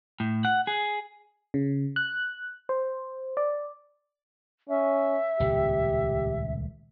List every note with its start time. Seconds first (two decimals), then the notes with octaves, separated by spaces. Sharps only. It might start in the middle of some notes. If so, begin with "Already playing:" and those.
0.20 A2
0.45 F#5
0.67 G#4
1.54 C#3
1.96 F#6
2.69 C5
3.37 D5
4.69 C#4 E5
5.40 D#1 C#2 A2 G4